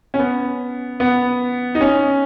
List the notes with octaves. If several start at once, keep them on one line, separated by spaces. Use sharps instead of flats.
C#4
B3
B3
D#4
C#4